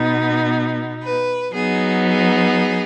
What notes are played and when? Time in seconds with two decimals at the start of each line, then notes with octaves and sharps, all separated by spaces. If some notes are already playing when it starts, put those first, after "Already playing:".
Already playing: B2 B3 D#4
1.02 B4
1.54 F#3 B3 D#4 G#4
2.07 G#4